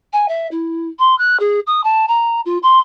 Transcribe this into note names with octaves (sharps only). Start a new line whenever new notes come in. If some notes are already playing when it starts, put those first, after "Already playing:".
G#5
E5
E4
C6
F#6
G#4
D#6
A5
A#5
F4
C6